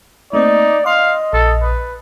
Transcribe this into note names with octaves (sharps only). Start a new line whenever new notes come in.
A3 A#3 C4 D#4 D5
D#5 F5 C6
A#1 A4
B4